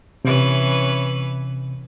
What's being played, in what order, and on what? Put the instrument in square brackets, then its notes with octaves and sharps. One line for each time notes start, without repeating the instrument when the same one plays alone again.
[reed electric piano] C3 [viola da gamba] E3 C#4 B4